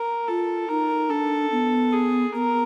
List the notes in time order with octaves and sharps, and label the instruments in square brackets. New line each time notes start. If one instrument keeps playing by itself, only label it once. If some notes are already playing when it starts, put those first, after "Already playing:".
Already playing: [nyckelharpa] A#4
[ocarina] F4 [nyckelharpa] A4
[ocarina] D#4 [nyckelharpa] A#4
[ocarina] D4 [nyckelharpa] A4
[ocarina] B3
[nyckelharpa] G#4
[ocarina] B3 [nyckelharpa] A#4